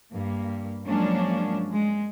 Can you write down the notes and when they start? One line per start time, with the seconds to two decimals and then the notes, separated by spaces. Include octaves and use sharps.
0.14 G2 A#3
0.88 F3 F#3 G#3 A#3 C#4 D4
1.72 G#3